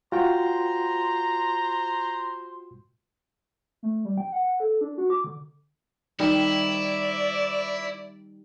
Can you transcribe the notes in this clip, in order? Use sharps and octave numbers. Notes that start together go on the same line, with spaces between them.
F4 F#4 C5 G5 A#5 C6
A3
G3
G5
F#5
A4
D4
F#4
D6
D3
D#3 G3 E4 D5